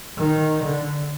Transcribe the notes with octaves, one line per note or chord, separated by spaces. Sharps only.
D#3
D3